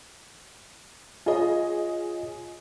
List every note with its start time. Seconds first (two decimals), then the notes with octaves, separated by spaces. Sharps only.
1.26 F4 G#4 C#5 D#5